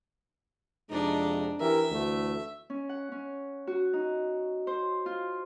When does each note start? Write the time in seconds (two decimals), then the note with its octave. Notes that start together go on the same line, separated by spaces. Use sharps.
0.90 F2 C3 G#3 D4 D#4
1.60 E3 G4 A#4 E5
1.90 D2 E3 A3
2.70 C#4
2.89 F#5
3.12 C#4
3.67 F#4
3.93 D#4
4.67 C5
5.06 F4